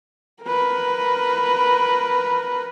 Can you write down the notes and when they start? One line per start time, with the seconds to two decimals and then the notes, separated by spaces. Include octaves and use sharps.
0.43 A#4 B4